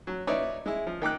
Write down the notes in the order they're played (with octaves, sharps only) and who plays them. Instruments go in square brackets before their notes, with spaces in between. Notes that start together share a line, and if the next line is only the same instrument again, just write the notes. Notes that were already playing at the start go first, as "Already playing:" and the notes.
[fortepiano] F#3
D#4 E4 B4 C#5 D5 E5
G#3 E4
F3
D#3 G5 D6 F#6